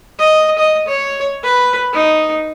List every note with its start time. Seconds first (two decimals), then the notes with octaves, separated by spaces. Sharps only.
0.19 D#5
0.58 D#5
0.88 C#5
1.44 B4
1.94 D#4